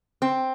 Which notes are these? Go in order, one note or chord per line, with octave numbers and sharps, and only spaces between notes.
C4